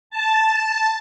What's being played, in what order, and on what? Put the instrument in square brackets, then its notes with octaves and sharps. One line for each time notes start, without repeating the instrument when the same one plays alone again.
[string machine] A5